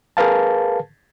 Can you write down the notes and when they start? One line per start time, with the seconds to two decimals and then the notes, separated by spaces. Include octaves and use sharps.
0.17 G#4 A#4 B4 F5 A5